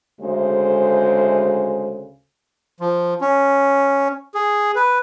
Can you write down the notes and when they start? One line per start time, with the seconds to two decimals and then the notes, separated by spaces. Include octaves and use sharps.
0.21 D2 C#3 G#3 A3 C5
2.80 F3
3.21 C#4
4.35 G#4
4.75 B4